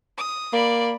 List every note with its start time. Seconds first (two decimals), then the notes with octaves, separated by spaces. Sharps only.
0.18 D#6
0.53 A#3 D5 B5